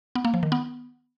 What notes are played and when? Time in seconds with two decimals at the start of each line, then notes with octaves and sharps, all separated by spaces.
0.15 B3
0.25 A#3
0.34 F3
0.43 D#3
0.52 B3